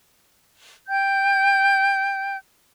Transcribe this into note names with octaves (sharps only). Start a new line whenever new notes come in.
G5 G6